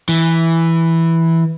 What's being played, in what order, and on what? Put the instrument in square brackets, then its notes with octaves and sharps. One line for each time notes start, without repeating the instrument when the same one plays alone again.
[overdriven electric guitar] E3